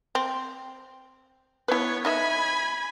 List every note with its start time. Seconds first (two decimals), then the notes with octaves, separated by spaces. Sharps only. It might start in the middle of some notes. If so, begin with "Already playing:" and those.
0.15 C4
1.68 B3 E4 B4 C#5
2.05 D#4 D#5 E5 G#5 B5